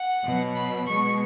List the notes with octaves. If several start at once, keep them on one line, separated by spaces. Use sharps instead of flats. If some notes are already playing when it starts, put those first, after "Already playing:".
Already playing: F#5
B2 F#3
B5
B2 G#3 C#6